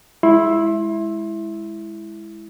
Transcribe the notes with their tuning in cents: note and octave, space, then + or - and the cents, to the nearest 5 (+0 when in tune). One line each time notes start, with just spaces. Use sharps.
G#3 +0 E4 +0 C6 +30